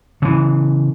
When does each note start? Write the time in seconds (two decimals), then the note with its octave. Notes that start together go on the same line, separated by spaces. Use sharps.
0.22 C#3 E3